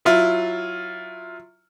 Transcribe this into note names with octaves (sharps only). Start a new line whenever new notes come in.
F#3 E4 F4